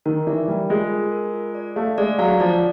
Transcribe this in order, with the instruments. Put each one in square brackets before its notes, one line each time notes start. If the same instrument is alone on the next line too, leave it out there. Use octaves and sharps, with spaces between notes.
[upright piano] D#3 [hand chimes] A#4
[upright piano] E3 [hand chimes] D5
[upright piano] G3 [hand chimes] A#4
[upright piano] G#3 [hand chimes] F4
[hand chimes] A#4
A#4
F4
D5
[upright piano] A3 [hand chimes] F5
[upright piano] G#3 [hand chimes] D5
[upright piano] F#3 [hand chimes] F5
[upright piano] F3 [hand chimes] D5